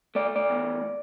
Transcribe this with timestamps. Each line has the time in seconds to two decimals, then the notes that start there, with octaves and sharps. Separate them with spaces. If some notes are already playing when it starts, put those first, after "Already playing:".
0.15 A3 D5
0.36 D5
0.50 E2